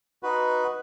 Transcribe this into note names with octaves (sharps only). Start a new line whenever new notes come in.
D#4 F#4 B4